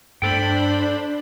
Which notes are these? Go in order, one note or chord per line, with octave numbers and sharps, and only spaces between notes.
G2 A3 D4 A4 C5 G5 B5